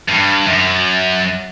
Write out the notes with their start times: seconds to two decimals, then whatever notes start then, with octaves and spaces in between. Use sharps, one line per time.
0.08 G2
0.47 F#2